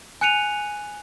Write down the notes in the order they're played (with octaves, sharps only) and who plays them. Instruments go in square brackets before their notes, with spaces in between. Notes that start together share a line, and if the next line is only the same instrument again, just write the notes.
[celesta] G#5 F#6 C#7 D#7 F7